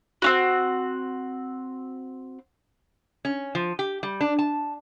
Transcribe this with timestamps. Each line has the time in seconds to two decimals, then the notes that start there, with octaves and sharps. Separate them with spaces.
0.22 C4 C#4 F#4
3.25 C#4
3.55 F3
3.79 G4
4.03 G3
4.21 D4
4.39 A5